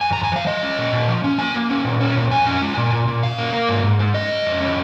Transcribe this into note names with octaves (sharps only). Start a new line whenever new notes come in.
F2 G#5
A#5
F2
G#5
F3 F5
G#3 D#5
C#4
A#2
A#2
F3
C#4
A#3 G#5
A#3
C#4
A#2
C#4
A#2
F2 G#5
C#4
G#3
A#2
A#2
A#2
C#3 F5
A#3
A#3
G#2
G#2
G#3
C#4 D#5
C#3
F2
C#4